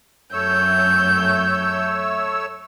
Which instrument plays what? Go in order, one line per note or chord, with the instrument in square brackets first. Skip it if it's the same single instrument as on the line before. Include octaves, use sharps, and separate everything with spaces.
[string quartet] F#2 G6 [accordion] A3 C#5 E6